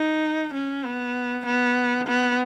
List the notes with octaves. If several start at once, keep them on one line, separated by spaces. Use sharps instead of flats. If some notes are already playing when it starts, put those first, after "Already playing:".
Already playing: D#4
C#4
B3
B3
B3